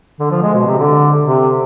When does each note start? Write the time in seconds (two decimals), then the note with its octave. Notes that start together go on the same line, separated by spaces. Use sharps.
0.19 D3
0.31 F3
0.42 G#3
0.54 B2
0.67 C3
0.78 D3
1.23 C3